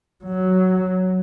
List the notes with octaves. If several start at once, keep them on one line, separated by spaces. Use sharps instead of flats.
F#3